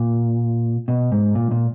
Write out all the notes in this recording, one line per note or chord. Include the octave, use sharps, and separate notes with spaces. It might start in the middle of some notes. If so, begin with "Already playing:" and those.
Already playing: A#2
B2
G#2
A#2
A#2